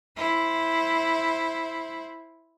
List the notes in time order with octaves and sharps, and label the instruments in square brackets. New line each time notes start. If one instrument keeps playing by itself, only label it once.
[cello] E4 C5